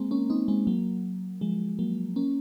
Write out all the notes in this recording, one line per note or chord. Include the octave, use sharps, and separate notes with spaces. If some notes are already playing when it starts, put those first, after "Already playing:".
Already playing: G#3 A#3 C4
A#3 C#4
C4 D#4
G#3 C4
F#3 A#3
F3 G#3
F#3 A#3
A#3 C#4